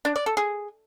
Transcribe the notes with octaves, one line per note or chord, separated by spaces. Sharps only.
D4
D5
A4
G#4